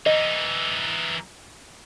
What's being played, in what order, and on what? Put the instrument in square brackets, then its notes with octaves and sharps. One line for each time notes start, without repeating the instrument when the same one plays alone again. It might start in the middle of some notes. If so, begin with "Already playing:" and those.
[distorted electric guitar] E3 D#4 [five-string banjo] D#5